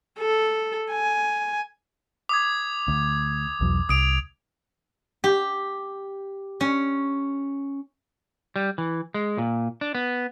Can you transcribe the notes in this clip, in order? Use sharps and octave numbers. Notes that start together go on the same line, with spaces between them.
A4
G#5
D6 D#6 G#6
D2
B1 E2 F#3
C2 D#6 D7 F7
G4
C#4
G3
E3
G#3
A#2
D4
B3